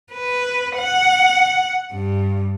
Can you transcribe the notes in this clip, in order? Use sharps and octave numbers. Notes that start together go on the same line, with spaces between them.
B4
F#5
G2